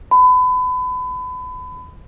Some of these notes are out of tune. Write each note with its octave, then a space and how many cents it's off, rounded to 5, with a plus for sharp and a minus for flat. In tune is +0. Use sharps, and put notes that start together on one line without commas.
B5 +30